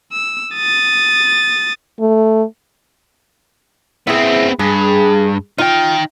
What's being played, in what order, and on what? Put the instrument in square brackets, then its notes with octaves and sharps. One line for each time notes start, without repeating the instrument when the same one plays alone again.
[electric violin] E6
D#6 A6
[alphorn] A3
[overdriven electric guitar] B3 C4 [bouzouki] E4 G#4
[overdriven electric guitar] G2 [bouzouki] G#4
[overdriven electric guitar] D#4 G5 [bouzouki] F4